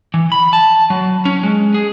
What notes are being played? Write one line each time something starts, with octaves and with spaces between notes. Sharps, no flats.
E3
B5
A5
F#3
C#4
G#3
G#4